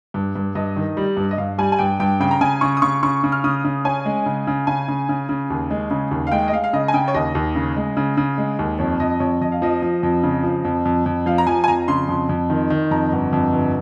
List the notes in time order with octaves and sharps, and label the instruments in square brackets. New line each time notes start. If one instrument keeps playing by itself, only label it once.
[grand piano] G2
G2
[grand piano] G2 [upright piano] D#5
[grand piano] D#3
G3
G2
[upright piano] D#5
[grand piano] G2 [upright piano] F5
[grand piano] G3 [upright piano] G#5
[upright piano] G#5
[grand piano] G2 [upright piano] G5
[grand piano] G2 [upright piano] G5
[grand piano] C#3 [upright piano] G5
[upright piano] A#5
[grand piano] C#3 [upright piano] G#5
[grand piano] C#3 [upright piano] C#6
[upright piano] D#6
[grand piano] C#3 [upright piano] C#6
[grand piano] C#3 [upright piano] C#6
[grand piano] C#3
[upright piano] F6
[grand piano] C#3 [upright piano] D#6
[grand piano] C#3
[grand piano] C#4 [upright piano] G#5
[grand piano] G#3
C#3
C#3
[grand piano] C#3 [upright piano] G#5
[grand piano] C#3
C#3
C#3
D#2
G#3
C#3
D#2
[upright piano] F5
[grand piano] G#3 [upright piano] G5
[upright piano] D#5
[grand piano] G#3 [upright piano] F5
[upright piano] F5
[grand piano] C#3 [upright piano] D#5
[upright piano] G#5
[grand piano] C#3 [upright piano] G5
[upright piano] C#5
[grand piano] D#2 [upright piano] D#5
[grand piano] D#2
C#3
G#3
C#3
C#3
G#3
D#2
[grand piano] F2 [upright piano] C#5
[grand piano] F2 [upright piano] D#5
[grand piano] F2 [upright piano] C#5
[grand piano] F2 [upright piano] D#5
[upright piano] F5
[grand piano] F3 [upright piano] D#5
[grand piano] F3
F2
C#3
F3
F2
F2
F2
[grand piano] F3 [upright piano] F5
[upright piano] A#5
[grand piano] F3 [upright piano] G#5
[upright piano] G#5
[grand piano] F2 [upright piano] A#5
[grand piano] C#3 [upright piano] C6
[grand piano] F2
F2
D#3
D#3
[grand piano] F2 [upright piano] A#5
[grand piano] G1
F2
G1